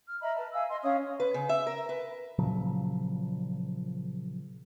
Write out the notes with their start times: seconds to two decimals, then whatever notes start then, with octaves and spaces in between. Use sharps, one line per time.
0.07 F6
0.21 D#5 E5 A#5 B5
0.36 B4 A5
0.53 E5 F5 G#5 E6
0.70 D#5 C6
0.82 C#4 C#5 F5 D#6
1.20 B4
1.34 C#3
1.49 E5
1.67 A#4
1.89 B4
2.38 A#2 C#3 F3 F#3